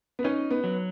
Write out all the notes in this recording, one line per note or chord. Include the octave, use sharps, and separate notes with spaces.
B3
C#4 D#4
B3
F#3